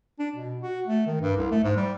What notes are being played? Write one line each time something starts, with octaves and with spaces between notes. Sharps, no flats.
D4
B2
F#4
A3
D#3
G2
C2
A3
G#2
G3